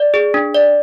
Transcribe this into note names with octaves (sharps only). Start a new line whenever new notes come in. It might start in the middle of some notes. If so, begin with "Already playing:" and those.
Already playing: D5
G#4
D4
D5